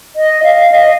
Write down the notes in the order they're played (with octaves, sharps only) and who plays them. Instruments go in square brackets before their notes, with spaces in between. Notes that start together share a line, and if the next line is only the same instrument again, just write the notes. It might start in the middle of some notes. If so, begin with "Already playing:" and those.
[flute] D#5
F5
D#5